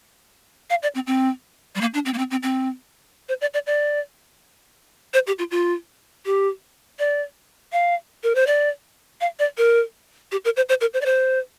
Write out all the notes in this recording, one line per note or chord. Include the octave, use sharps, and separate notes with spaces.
F5
D5
C4
C4
G3
A#3
D4
C4
A#3
C4
C4
C4
C5
D5
D5
D5
C5
G4
F4
F4
G4
D5
F5
A#4
C5
D5
F5
D5
A#4
G4
A#4
C5
C5
A#4
C5
D5
C5